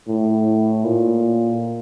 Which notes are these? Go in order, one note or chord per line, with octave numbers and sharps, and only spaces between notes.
A2
A#2